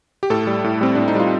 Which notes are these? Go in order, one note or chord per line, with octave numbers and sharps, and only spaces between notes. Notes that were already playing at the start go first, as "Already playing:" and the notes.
G4
A2 A4
G3
A2
G3 C4
A2 D4
D#4
G3 F4